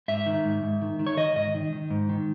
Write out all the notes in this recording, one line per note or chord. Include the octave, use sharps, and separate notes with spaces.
G#2 E5
D#3
G#2
G#2
D#3
D#3
C#5
D#3 D#5
G#2 D#5
D#3
D#3
G#2
D#3